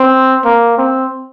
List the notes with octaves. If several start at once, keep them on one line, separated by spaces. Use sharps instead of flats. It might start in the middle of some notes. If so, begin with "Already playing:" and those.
Already playing: C4
A#3
C4